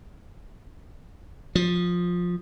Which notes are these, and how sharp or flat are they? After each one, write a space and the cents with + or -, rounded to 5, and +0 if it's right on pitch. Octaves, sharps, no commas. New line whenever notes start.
F3 +15